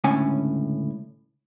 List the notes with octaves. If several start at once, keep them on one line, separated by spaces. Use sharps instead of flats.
C#2 A2 D3 C#4 G#5